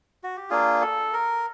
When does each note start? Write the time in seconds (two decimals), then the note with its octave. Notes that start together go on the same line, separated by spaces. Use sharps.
0.23 F#4
0.37 G4
0.50 A#3 D4 F4 G#4
0.82 A4
1.13 A#4